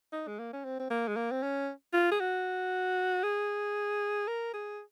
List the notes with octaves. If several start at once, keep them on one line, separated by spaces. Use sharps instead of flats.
D#4
G#3
A#3
C#4
C4
C4
A#3
G#3
A#3
C4
C#4
F4
G#4
F#4
G#4
A#4
G#4